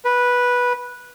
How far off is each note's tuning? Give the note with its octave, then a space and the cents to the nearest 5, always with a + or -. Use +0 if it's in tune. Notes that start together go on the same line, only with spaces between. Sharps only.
B4 -10